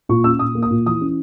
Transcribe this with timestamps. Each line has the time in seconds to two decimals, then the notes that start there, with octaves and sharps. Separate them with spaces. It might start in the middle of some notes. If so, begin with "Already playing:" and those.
0.09 A#2 C#6
0.24 C#4 E6
0.39 A#2 D#6
0.55 A#3
0.63 D#6
0.70 A#2
0.86 E3 D#6
1.01 C#4